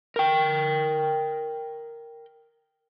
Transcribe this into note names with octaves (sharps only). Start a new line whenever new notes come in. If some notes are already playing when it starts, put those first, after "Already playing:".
A#4 G5